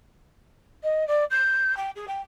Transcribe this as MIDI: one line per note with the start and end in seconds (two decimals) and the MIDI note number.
0.83 1.07 75
1.07 1.24 74
1.30 1.76 91
1.77 1.90 79
1.96 2.05 68
2.08 2.21 79